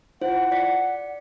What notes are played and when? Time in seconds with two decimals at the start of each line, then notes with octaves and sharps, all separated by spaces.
0.22 E4 F4 C5 F#5
0.51 D5 B6 C#7